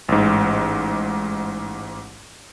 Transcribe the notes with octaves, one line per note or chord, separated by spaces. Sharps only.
A1 G#2